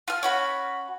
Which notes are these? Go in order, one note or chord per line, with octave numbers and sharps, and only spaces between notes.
F4 F6
C#4 F#4 B5